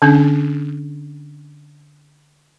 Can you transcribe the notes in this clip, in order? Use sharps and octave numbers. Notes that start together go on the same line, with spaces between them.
D3 C#4 D4